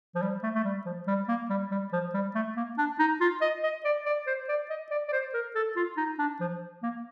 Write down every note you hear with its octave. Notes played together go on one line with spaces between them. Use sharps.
F3
G3
A3
A3
G3
F3
G3
A#3
G3
G3
F3
G3
A3
A#3
D4
D#4
F4
D#5
D#5
D5
D5
C5
D5
D#5
D5
D5
C5
A#4
A4
F4
D#4
D4
F3
A#3